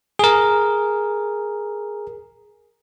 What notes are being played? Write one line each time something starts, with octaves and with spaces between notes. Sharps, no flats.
G#4 A#4